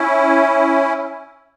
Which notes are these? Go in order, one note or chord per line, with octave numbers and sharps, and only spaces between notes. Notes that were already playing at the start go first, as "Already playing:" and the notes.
Already playing: C#4 E4